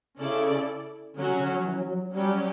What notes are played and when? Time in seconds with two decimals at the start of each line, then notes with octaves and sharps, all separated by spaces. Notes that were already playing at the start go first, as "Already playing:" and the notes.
0.19 C#3 C#4 E4 A4 D5
1.16 D3 F#3 C#4 F#4
1.28 C#3
1.40 D3
1.53 F#3
1.64 E3
1.77 F#3
1.88 F#3
2.13 F#3 G3 C#4 G4